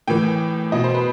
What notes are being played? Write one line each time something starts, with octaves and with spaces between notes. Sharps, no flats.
A2 E3 G5
B2 D#5
C5
B4